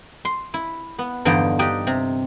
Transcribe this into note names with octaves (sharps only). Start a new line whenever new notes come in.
C6
E4
B3
E2 G2 D3 F3 D#4 G5
D4 D#4 G4 D#5 G5
C3